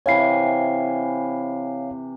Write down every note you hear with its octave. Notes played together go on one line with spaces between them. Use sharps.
C3 E3 C#5 F5 G#5 C7